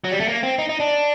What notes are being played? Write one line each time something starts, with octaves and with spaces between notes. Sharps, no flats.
F#3
G3
A3
A#3
C4
D#4
D#4
D4